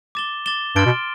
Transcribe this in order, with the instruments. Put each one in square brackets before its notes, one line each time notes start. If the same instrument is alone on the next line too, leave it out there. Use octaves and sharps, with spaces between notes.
[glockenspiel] D6 A6 E7 G7
D6 A6 E7 G7
[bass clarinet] G2 [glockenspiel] C6 F6 A6 D7 G7
[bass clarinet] B2